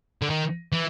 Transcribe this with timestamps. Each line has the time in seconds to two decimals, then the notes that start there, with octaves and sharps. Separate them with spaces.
0.22 D3
0.30 D#3
0.72 E3